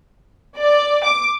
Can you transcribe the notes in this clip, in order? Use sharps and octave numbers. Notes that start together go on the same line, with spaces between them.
D5
D6